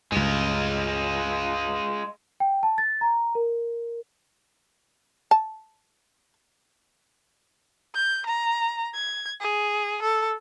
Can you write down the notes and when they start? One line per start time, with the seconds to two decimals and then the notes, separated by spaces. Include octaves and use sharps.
0.12 C#2 G2 G#3 F4
2.40 G5
2.63 A5
2.78 A6
3.01 A#5
3.35 A#4
5.31 A5
7.95 G6
8.27 A#5
8.94 G#6
9.40 G#4
10.02 A4